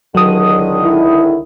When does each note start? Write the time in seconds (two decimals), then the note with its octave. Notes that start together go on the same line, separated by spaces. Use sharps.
0.15 C#2 D3 D#3 F#3 D#6
0.83 E4